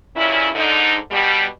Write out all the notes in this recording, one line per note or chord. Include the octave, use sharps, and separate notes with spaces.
G2 A#2 C#3 C#4 E4
G#2 D3 D#4
B2 G3